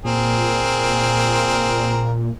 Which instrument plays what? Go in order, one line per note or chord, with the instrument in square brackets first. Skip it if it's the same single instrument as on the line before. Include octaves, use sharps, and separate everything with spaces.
[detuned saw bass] A#2 [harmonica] C4 G#4 A#4